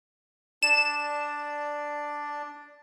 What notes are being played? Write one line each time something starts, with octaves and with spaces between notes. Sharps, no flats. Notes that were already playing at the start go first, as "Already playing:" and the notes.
D4 D5 E7